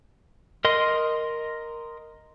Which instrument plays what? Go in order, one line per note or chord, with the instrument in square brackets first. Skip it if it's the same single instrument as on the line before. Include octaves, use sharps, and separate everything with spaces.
[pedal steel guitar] A#4 D#5 C6